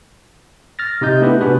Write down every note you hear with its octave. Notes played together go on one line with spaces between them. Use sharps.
F6 A6 A#6
C3 D#4 D#5 G6
A3 B3 D4 E4 G4 B4
C3 D4 F#4 G#4 B4